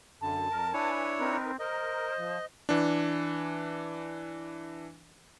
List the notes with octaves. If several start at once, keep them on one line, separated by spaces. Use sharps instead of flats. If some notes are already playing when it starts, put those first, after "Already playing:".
F#2 D3 A5
F2 A#4
D4 E4 B4 C#5 G#5
C4 D#4 A#4 B4
A#4 C5 D#5
F3
E3 D4